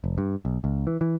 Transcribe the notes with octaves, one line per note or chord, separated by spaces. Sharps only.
F1
G2
B1
C#2
E3
E3